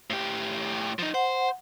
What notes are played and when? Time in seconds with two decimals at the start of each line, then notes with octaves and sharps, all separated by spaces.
0.10 A2 G4
0.99 F3 D#4
1.14 C5 F#5